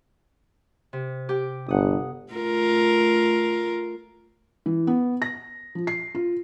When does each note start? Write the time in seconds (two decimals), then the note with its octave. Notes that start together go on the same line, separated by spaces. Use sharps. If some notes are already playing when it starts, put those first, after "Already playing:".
0.93 C3
1.29 G4 G5
1.69 G1 F#5 D#6
2.32 A3 F4 A#4
4.66 E3
4.87 B3
5.22 A#6
5.75 F3
5.87 C7
6.15 F4